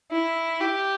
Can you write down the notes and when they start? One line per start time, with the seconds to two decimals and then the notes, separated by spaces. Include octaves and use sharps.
0.12 E4
0.61 G4